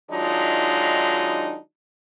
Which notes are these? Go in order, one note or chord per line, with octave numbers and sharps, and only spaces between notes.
D#3 F#3 G#3 D4 D#4 F4